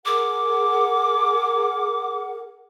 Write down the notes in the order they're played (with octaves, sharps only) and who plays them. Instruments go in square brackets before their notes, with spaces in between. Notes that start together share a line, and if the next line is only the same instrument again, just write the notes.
[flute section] G#4 A#4 F#5 [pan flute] D6